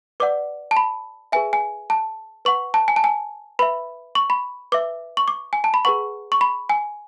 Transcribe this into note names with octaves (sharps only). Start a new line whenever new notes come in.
B4 D5 F#5 D6
A5
B5
G#4 B4 E5 G#5
G#5
A5
B4 F#5 C#6
A5
G#5
A5
G#5
B4 E5 B5
C#6
B5
B4 E5 D6
C#6
D6
G#5
A5
B5
G#4 B4 F#5 C#6
C#6
B5
G#5